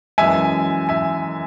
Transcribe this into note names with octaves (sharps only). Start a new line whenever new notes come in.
F#2 E3 G#3 E5 G#5
E5 G#5